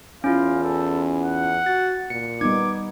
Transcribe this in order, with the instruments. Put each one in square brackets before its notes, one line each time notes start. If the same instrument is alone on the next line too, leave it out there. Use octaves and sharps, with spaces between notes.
[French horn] E2 [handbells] C#4 E4 F4 [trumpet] F5
[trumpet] A4
F#5
[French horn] F#4 [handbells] A6
[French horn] A#2 [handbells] C#7
[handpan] G3 B3 D#4 [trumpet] D6 [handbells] G#6